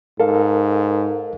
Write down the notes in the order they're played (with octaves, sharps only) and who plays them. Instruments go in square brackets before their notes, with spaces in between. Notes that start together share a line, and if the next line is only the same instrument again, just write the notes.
[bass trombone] G#2 [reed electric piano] A4 A#4 F5